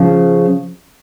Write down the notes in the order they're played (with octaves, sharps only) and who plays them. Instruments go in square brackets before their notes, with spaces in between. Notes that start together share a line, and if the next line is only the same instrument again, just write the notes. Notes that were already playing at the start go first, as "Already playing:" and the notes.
Already playing: [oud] C#3 F3